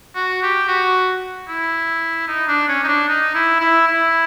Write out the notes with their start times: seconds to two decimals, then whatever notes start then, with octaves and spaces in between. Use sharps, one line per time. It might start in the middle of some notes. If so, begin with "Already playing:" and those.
0.16 F#4
0.43 G4
0.68 F#4
1.48 E4
2.28 D#4
2.48 D4
2.68 C#4
2.84 D#4
2.88 D4
3.08 D#4
3.35 E4
3.61 E4
3.88 E4